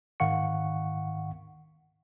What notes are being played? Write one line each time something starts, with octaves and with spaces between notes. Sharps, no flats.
G#2 D#3 F5 F#5 C#6 C#7